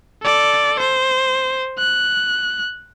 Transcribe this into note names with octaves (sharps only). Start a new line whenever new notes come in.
A4 D5
C5
F#6